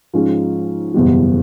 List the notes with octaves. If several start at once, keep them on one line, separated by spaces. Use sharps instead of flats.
G#2 F3 G#3 C#4
F#1 E2 B2 G3